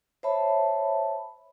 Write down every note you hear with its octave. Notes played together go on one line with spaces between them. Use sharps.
C5 C#5 E5 A5 B5